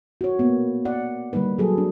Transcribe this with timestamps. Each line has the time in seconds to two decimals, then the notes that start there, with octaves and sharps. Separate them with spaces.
0.21 F#4 C#5
0.39 A#3 B3
0.85 D5 F#5
1.33 D3 G3 A#3 D#4 B4
1.58 F#3 G#4 A4
1.78 D4